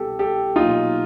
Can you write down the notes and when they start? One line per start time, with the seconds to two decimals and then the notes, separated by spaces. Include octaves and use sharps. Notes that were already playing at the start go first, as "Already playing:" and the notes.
Already playing: C2 B2 G3 G4 A4
0.19 G4 A4
0.56 B1 A#2 F#3 D#4 F4